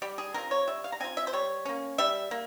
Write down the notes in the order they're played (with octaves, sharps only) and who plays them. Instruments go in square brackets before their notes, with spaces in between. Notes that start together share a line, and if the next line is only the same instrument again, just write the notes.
[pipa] G3 G4
G#4
C4 F4 A#4
C#5
G3 E5
F5
A#5
C4 F4 G#5
E5
C5
G3 C#5
A#3 C#4
G3 E5
A#3